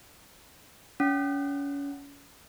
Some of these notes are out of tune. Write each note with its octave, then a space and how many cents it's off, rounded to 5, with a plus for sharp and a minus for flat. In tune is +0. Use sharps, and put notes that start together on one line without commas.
C#4 +30 F#5 +0